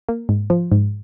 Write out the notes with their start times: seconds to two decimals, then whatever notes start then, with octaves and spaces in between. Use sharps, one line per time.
0.09 A#3
0.29 G#2
0.50 F3
0.72 G#2